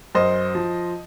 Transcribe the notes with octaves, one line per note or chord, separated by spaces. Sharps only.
F#2 C5 D#5
F3